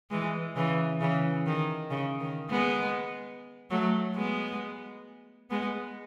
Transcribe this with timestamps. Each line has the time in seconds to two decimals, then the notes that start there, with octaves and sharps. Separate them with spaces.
0.11 E3 G#3
0.56 C#3 E3
1.00 C#3 E3
1.46 D#3
1.91 C#3
2.21 D#3
2.50 G#3 B3
3.71 F#3 A3
4.15 G#3 B3
5.50 G#3 B3